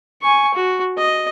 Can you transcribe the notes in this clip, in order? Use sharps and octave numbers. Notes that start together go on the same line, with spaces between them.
G#5 C#6
F#4
D#5